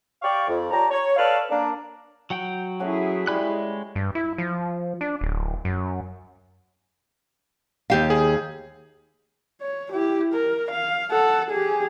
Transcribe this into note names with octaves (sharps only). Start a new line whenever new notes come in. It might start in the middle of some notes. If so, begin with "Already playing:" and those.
G4 D5 F5 C#6
F2
G3 G4 C#5 A5 A#5
C#5
A4 B4 C#5 D5 F5
A#3 D4
F#3 F#5 G5
A3 C#4 E4 F#4 G#4
G3 G#3 B5 F#6
G2
E4
F3
D4
D1
F#2
D#2 G4 F5
G#4
C#5
E4 G4
A#4
F5
A4 F#5
G4 G#4